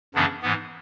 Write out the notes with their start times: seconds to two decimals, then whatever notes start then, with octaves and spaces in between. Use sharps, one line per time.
0.14 F#2 C#3 E3 B3 D4
0.42 G#2 E3 B3